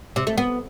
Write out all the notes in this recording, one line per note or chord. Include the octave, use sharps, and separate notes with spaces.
C3
A3
B3